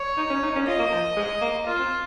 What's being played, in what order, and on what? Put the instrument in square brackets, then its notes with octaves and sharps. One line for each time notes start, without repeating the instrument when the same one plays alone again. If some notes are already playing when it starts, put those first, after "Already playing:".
Already playing: [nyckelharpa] C#5
[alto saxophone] D#4
C#4
D#4
C#4
[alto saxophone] F4 [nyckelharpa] D#5
[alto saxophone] A#3
F3
G#3
A#3
[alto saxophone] A#3 [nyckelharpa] F4
[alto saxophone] C4